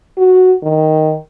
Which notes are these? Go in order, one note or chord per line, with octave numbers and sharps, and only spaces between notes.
F#4
D#3